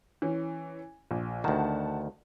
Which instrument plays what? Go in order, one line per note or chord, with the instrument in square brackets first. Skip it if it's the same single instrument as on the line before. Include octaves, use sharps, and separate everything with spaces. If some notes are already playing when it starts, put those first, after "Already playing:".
[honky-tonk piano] E3 C#4
A#1
[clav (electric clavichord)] D2 D#3 [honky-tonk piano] F#5 A5